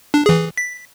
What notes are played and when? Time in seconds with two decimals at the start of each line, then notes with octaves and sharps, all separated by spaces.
0.14 D4
0.26 E3 G#4
0.58 B6